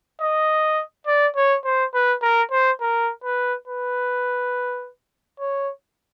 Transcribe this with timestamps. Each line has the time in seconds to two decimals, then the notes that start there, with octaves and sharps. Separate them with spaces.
0.21 D#5
1.07 D5
1.36 C#5
1.65 C5
1.94 B4
2.22 A#4
2.51 C5
2.81 A#4
3.24 B4
3.68 B4
5.40 C#5